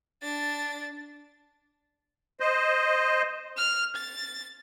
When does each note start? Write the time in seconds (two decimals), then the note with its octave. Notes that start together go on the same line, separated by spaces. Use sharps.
0.22 D4 A6
2.40 C5 D#5
3.57 F6
3.96 A6